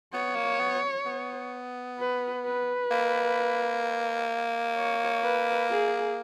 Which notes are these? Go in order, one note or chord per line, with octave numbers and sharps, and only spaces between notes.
B3 C#5
A#3
B3
B3
B4
B4
A#3
C#5
B4
G#4